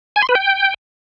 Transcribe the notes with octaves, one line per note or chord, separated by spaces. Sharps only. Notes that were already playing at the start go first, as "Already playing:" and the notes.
G#5
C6
B4
G5